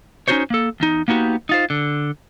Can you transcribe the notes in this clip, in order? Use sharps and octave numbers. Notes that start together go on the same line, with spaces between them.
C#4 D#4 F4 F#4 C5 C#5
A#3 A4
E2 D#4
A#3 B3 D#4 F#4 G4
D#4 F4 C5
D3